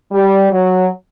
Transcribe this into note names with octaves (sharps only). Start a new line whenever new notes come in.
G3
F#3